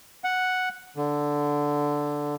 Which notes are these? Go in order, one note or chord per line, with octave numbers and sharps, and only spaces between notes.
F#5
D3